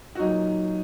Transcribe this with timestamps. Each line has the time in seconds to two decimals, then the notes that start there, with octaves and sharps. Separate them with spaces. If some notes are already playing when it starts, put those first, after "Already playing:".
0.15 F#4
0.19 A#2 F#3 D#4